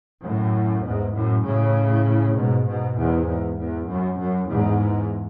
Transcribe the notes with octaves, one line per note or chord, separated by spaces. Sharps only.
F#2 A2
E2 G#2
F#2 A2
A2 C#3
G#2 B2
G#2 B2
E2 G#2
E2
E2
F#2
F#2
E2 G#2